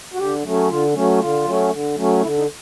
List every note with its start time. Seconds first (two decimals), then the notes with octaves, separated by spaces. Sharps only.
0.13 F#4
0.18 D3 G4
0.44 F#3 A3 C#4
0.69 D3 F4
0.94 F#3 A3 C#4
1.20 D3 F4
1.44 F#3 A3 C#4
1.70 D3
1.95 F#3 A3 C#4
2.21 D3 E4
2.38 D#4